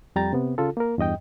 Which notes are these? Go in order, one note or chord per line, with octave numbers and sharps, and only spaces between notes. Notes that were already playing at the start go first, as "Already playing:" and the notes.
F2 G3 G5 A#5 A6
C3 B3
C#3 F4 A4
A#3 A#4
E2 G2 D#5 G5